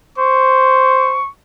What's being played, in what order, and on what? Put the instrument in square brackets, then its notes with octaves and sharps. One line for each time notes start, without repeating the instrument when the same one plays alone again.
[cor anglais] C5 [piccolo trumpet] C#6